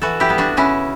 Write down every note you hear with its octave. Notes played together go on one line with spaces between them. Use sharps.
E3 F#4 A4
E4 G4
G3 B3
D4 F#4
C#3 C#4 E4